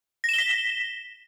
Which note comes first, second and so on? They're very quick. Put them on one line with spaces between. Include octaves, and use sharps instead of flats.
A#6 E7 G7 B6